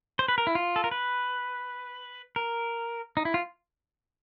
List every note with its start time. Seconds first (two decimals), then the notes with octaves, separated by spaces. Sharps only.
0.19 C5
0.28 B4
0.38 A#4
0.47 E4
0.55 F4
0.76 A4
0.84 A#4
0.91 B4
2.36 A#4
3.17 D#4
3.25 E4
3.34 F4